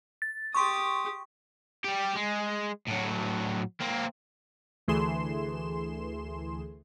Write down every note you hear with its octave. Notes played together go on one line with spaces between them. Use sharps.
A6
G4 C6 C#6 D#6
G3 G4
G#3
A2 F#3
A#3 C4
D2 E3 A3 G#4 C6 E7